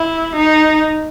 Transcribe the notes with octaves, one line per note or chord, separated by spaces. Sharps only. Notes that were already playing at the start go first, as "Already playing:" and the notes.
Already playing: E4
D#4